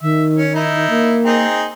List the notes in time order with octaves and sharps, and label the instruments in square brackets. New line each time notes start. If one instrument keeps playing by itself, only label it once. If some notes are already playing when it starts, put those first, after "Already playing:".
[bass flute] D#3 [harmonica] E5
[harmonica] C#4
D#4 E4
[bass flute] A#3
[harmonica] C4 D#4 G#4